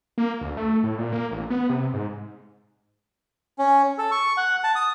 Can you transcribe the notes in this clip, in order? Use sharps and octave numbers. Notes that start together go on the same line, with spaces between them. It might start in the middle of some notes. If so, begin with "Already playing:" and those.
A#3
D2
A3
A2
A#2
A#3
A1
B3
C3
G#2
C#4
A4
C#6
F#5
A5
D#6